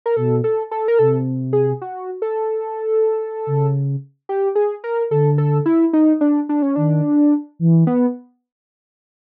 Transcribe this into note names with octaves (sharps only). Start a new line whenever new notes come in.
A#4
B2 A4
A4
A4
A#4
C3 A4
G#4
F#4
A4
C#3
G4
G#4
A#4
D3 A4
A4
E4
D#4
D4
D4
C#4
D#3 D4
E3
B3